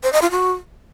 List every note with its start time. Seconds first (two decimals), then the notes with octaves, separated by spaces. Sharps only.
0.03 C5
0.13 D#5
0.22 F4
0.31 F#4